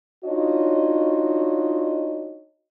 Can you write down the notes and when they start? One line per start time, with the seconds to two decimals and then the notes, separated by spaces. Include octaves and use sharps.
0.24 D4 D#4 F4 F#4 C#5 D#5